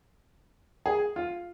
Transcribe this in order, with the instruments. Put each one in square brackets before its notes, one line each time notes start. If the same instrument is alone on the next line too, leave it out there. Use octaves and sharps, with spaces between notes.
[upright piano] G#4
F4